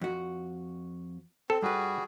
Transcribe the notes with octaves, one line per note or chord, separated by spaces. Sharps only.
F2 F#4
C4 A4
G2 G3 F#4 G#4 B4